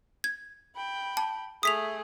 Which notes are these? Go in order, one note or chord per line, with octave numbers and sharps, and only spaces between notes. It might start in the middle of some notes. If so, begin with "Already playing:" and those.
G#6
G5 B5
A5
A3 G#4 D#6 B6 F7